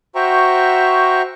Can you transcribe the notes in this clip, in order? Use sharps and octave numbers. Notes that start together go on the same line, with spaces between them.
F#4 C5 E5 G5 A#5 C#6